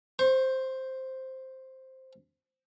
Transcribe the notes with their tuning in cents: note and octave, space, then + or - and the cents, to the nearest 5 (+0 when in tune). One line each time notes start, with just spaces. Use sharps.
C5 +0 C#6 -40